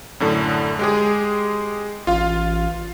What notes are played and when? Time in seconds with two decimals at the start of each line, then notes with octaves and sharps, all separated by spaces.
0.20 F#2 A2 D3
0.79 G#3 G4 G#4
2.07 A1 F4 F5